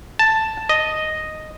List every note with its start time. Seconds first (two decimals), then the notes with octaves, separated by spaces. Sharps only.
0.19 A5
0.69 D#5